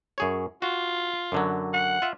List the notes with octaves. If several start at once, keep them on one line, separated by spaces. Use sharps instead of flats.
F#2 G#4 C#5
F4 F#4
F#2 D3 F#3
F#5
F4 E5